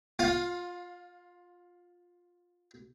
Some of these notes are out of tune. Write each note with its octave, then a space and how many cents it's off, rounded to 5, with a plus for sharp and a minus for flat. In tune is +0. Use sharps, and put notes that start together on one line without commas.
F4 +10 F5 +30